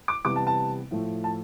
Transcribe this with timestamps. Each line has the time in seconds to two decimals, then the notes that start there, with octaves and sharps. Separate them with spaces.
0.08 D6
0.25 C3 E3 G3 B3 D6
0.36 A5
0.47 A5
0.91 A2 F3 A3
1.24 A5